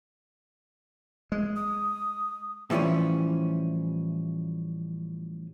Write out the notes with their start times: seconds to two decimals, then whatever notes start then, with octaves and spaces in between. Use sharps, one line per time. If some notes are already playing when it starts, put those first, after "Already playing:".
1.32 G#3
1.56 D#6
2.70 A2 E3 F3 G3 C#4